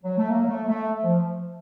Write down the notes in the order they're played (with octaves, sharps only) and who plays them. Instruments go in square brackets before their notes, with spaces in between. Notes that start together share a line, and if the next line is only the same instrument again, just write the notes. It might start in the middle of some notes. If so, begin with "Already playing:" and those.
[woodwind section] F#3
A3
A#3
F#3
A3
A3
F3